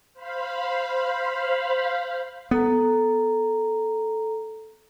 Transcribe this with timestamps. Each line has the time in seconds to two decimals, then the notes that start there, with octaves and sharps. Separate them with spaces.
0.14 C5 F5 B5
2.51 B3 A4 A#5